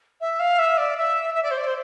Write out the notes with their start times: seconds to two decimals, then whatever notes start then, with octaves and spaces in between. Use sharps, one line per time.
0.21 E5
0.40 F5
0.59 E5
0.78 D5
0.97 E5
1.35 E5
1.43 D5
1.51 C5
1.58 D5
1.67 C5